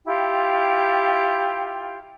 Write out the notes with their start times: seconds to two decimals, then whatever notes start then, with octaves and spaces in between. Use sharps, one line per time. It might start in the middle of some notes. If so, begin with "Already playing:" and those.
0.05 E4 F4 G4 G5